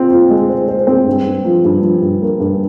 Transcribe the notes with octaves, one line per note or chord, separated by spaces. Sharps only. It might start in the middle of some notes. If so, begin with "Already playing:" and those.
Already playing: C4 F4
F4
G#3
C5
C5
C4
G2
G2
F3
G2
F3
G2
A#3
G2